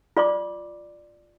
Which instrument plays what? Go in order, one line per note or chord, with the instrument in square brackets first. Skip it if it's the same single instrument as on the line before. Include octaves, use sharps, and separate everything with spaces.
[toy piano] F4 D5 C6 D6